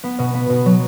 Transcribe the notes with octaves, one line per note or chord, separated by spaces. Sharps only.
B3
B2
B3
B2
F#3